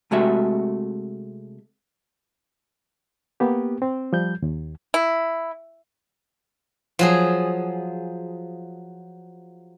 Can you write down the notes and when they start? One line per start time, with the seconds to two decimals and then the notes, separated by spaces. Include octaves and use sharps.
0.11 C3 G#3 A3 F#4 E5
3.40 A#3 B3 G4
3.82 C4
4.13 F3 G3 G6
4.42 D#2
4.94 E4
6.99 F3 F#3 G#4